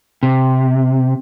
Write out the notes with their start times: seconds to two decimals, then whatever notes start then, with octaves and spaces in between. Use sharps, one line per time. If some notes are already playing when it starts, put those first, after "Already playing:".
0.23 C3